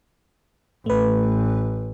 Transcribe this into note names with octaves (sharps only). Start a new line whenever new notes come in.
A1 A3 B4